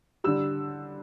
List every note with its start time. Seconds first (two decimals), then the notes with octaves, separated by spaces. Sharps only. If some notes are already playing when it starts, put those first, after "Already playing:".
0.24 D3 G3 E6